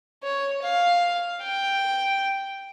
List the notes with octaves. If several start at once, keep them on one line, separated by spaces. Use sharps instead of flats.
C#5
F5
G5